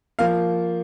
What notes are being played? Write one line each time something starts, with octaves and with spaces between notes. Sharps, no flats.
F3 A#3 F5